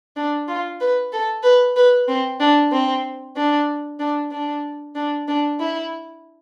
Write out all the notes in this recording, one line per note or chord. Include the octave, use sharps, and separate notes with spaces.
D4
F4
B4
A4
B4
B4
C4
D4
C4
D4
D4
D4
D4
D4
E4